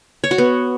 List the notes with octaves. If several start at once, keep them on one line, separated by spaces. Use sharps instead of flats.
C#5
F#4
B3